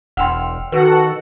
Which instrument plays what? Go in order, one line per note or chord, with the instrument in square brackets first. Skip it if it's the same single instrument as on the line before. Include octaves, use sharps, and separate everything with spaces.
[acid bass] E1 [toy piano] F#5 C6 [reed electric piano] G5 E6 F6
[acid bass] D#3 [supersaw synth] F#4 A4 F#5 [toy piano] B4